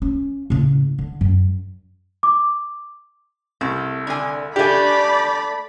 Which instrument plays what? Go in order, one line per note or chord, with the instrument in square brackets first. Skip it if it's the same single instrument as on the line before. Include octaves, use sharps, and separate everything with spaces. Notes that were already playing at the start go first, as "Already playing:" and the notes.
[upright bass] C#4
A2 C#3
D3
F#2
[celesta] D6
[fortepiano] C2 [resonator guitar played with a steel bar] A3
[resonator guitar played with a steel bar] D3 G#5
[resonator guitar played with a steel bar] A3 D4 [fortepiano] G4 G#5 [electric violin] D5 B5